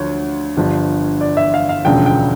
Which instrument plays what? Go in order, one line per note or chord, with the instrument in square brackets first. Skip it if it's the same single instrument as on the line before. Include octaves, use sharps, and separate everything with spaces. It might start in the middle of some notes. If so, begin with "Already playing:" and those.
Already playing: [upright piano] D2 F3 C#5
G1 G2 F3
D5
E5
F5
F5
E1 D2 C#3 F3 G5
G5